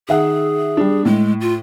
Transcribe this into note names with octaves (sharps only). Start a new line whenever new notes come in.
D#3 G#4 E5 F#5
G3 D4
A2 G#3
F4